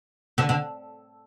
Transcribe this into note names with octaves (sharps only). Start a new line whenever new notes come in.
D3
D3